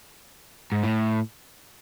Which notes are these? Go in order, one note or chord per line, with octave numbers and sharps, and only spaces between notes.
G#2
A2